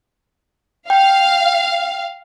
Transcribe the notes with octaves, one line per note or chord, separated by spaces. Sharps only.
F5 G5